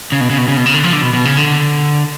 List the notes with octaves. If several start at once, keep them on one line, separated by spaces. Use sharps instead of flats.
C#3
B2
C#3
B2
C#3
B2
C#3
D3
F3
D3
B2
B2
C#3
D3